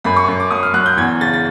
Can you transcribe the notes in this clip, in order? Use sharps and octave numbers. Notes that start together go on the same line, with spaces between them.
F#2 B5
C#6
F#2
D6
F#3 D#6
F6
F#3 F#6
G6
E2 G#6
C#3 A6
A6